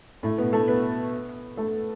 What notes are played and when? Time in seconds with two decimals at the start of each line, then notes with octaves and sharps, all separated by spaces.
0.23 A2 A3
0.38 B2 B3
0.53 A3 A4
0.68 B3 B4
1.57 A3 A4